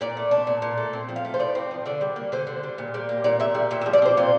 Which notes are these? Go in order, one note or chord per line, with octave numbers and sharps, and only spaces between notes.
A#2 D5
A3
D4
A#2
A#2
A3
C4
F3
F5
A3
C5
A2 D5
C4
F3
D3 D5
G3
A#3
D3 C5
D3
G3
A#2
G3
A#3
A#2 D5
A#2 E5
G3
A#2 E5
E5
F3
D5
C4 C5
A#2 F4